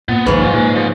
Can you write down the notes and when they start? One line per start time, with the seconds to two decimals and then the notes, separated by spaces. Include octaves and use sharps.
0.09 A#2 B3
0.26 A#1 D#2 G#2 C#3 F3 B4 B5
0.41 F#3 F4
0.53 A#2 G#3
0.76 F3 B3